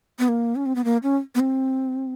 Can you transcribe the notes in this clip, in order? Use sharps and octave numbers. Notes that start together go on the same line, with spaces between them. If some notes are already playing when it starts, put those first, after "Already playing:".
B3
A#3
C#4
C4
B3
A#3
C#4
B3
C4